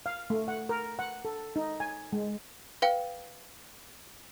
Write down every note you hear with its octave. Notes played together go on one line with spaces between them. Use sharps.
F5
A3
F#5
A#4
F#5
A4
D#4
G#5
G#3
B4 F5 G5